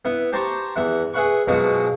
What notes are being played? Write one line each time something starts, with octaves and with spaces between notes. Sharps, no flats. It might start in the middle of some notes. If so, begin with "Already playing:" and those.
B3 E4
G4 C5 A5 A#5 C6 C#6
E2 E5 F#5
G#4 B4 E5 F#5 B5 C#6
B2 F3 F#3 G#3